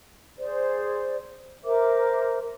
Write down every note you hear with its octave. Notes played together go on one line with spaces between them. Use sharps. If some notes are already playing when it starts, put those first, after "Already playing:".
G#4 C5 D5
A#4 C5 E5 D6